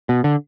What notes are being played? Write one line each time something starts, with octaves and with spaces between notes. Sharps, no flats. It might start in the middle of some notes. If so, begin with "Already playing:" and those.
B2
D3